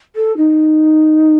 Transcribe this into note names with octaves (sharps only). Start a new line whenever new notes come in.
A4
D#4